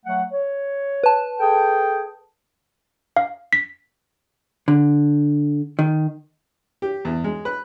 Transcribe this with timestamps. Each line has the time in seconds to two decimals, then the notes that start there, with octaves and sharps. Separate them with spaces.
0.05 F#3 A3 F#5
0.32 C#5
1.04 B4 A5
1.40 G#4 A4 G5
3.17 F5
3.53 B6
4.68 D3
5.79 D#3
6.82 G4
7.05 E2
7.24 G#3
7.45 B4